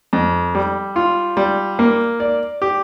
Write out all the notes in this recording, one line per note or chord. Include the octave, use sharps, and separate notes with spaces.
F2
G3
F4
G3
A#3
D5
G4